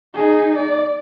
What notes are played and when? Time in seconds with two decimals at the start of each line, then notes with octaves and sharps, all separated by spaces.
0.14 D#4 G#4
0.56 D5